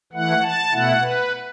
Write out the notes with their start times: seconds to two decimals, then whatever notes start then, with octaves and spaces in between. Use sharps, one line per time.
0.13 E3 A3 E4 F#5
0.43 A5
0.72 B2 A3 E4 F#5
1.01 B4